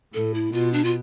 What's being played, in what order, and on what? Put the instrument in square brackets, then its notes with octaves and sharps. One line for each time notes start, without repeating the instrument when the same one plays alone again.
[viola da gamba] A2 [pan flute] A4
[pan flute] E4
[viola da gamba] B2 [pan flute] F4
[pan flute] D4
F4